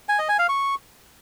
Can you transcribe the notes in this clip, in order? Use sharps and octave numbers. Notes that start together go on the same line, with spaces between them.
G#5
D#5
G#5
F5
C#6